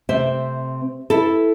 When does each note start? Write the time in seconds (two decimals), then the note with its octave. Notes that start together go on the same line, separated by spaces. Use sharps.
0.09 C3 A3 C4 C5 E5
1.10 E4 A4